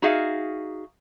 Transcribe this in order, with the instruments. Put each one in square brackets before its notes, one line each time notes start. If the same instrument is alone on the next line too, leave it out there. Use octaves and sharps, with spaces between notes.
[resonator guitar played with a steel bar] D#4 F#4 G#4 E5 F5